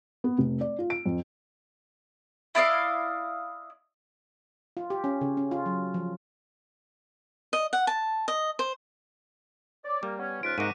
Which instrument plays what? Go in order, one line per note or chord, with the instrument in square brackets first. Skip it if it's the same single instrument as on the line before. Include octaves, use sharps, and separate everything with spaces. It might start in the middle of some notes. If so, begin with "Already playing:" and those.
[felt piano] B3
F1
D5
F4
D7
F2
[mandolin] E4 D5 D#5 F5
[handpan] F4
G4
C#4
C#3
C#4
F4
F#3
F3
[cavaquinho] D#5
F#5
A5
D#5
C5
[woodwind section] C#5 D5
[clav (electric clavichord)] G3 [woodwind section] A#3
[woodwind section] B3 C#4
[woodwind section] C#2 G#2 F4 [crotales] F#6 B6 D7
[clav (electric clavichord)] G#2 D#4 [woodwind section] C3 A#3 F#4 [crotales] D6 D7 D#7